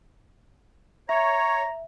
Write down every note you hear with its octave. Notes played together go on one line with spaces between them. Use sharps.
C#5 E5 A#5